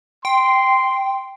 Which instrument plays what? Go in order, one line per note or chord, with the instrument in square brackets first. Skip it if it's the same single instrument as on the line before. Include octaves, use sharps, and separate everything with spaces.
[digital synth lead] G5 [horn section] C6